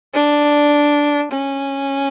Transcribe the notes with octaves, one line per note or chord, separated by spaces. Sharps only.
D4
C#4